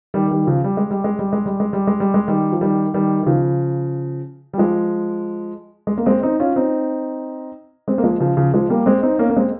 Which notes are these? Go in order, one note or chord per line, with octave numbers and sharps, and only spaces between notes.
D#3 G3
D#3 G3
C#3 F3
G3
G#3
G3
G#3
G3
G#3
G3
G#3
G3
G#3
G3
G#3
D#3 G3
F3
D#3 G3
D#3 G3
D#3
C#3 F3
G3
F3 G#3
G#3
A#3
G#3 C4
C4 D#4
C#4 F4
C4 D#4
G#3 C4
A#3
F3 G#3
C#3 F3
C#3 F3
F3 G#3
G3 A#3
G#3 C4
C4 D#4
A#3 C#4
A#3
G#3 C4